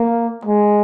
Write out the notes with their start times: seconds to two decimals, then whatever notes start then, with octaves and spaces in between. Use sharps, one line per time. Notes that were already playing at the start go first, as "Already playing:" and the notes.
Already playing: A#3
0.45 G#3